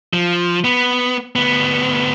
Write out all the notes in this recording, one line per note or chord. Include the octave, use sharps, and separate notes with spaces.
F3
B3
D2 B3